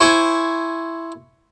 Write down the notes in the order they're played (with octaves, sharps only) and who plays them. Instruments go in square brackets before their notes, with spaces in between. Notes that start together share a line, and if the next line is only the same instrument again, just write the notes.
[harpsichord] E4 C5 G#5 C#6